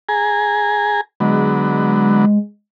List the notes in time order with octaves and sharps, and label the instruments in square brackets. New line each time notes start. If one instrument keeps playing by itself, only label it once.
[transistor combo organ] G#4 G#5 A#5
[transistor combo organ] D3 F#3 B3 [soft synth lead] G#3